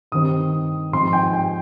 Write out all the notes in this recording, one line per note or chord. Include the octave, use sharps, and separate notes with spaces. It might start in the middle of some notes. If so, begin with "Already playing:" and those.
G2 D#3 G3 C4 D#4 D#6
G#2 F3 C4 D#4 C6
G5
G5